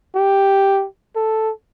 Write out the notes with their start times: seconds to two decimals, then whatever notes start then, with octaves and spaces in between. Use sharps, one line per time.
0.15 G4
1.16 A4